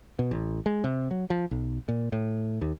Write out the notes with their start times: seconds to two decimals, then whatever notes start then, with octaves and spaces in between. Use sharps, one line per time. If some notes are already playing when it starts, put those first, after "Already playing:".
0.19 B2
0.31 A1
0.66 G#3
0.84 C3
1.11 F#3
1.30 F3
1.51 B1
1.88 A#2
2.12 A2
2.61 D#2